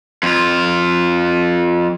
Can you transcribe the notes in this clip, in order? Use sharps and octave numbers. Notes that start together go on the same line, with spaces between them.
F2 F4